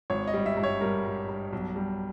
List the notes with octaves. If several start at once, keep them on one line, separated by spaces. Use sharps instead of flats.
G#1 C#5
D#5
G3
E5
G2
C#5
G3 A#4
G2
G2
B1
G3